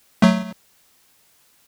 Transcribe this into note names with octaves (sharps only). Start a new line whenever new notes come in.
F#3 A3